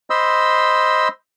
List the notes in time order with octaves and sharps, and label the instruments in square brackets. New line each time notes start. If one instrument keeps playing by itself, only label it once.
[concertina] C5 D#5 B5 C6 E6